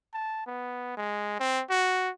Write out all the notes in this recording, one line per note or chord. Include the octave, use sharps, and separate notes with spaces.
A5
B3
G#3
C4
F#4